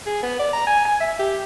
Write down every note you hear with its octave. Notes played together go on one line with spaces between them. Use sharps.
G#4
B3
D5
A#5
G#5
G#5
E5
G4